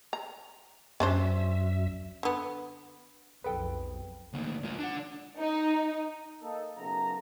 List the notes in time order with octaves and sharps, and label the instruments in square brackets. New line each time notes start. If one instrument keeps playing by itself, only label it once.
[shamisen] A#5
[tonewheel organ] F#2 E5 [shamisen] C#4 D4 C5
[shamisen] D3 B3
[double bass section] B1 F2 [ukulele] G#4 A4 G5 [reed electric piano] B4
[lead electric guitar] D2 A#3
G#3 F4
D4 F#5
[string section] D#4
[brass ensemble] A#3 D#4 A4
B1 F#2 C#3 A4 A#5